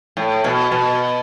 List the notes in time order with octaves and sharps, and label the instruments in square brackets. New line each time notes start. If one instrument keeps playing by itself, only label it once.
[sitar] A2
B2
B2